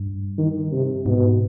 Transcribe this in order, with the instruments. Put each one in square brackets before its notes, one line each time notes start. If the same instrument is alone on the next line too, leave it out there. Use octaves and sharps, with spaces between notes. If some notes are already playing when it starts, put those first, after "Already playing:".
Already playing: [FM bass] G2
[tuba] D#3
C3
[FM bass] G#2 [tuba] B2